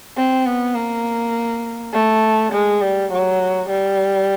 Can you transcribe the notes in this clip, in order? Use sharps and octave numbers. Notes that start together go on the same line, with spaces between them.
C4
B3
A#3
A3
G#3
G3
F#3
G3